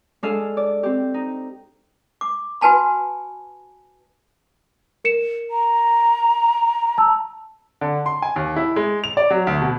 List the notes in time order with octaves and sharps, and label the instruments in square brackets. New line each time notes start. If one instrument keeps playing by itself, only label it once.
[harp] G#3 D4 G#4 A4 F5
D5
C4 G4
D#4
[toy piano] D6
F#4 B4 G#5 A5 B5
[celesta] A#4 C#7 E7
[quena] A#5
[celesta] A5 E6
[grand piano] D3
C6
G#5
D#2
E4
G#3
F7
D5
F#3
D2
B2